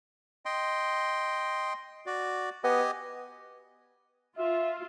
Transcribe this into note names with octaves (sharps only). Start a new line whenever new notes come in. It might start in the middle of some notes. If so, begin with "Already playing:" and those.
D#5 G5 C6
F#4 D5
B3 G4 D#5 G#5
F4 E5